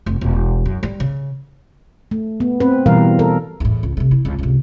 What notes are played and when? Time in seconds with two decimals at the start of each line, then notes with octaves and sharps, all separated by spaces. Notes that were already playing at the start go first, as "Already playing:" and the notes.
0.06 F1
0.21 E1
0.66 F#2
0.83 G3
1.00 C#3
2.11 A3
2.40 B3
2.60 C4 B4
2.86 B2 E3 G3 A#4 F5
3.19 A4 A#4
3.60 E2 A2
3.83 C#2
3.97 C3 A3
4.11 E4
4.25 C#2 C4
4.39 C#2 C3